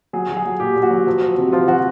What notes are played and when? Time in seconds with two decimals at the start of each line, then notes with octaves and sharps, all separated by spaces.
0.13 F#3 G#4
0.29 F#3
0.37 G#4
0.45 F#3
0.60 A#2 G4
0.76 A#2
0.83 F#4
0.91 F#3
1.07 F3
1.21 F3
1.38 C3
1.53 F3 F4
1.68 F3 F#4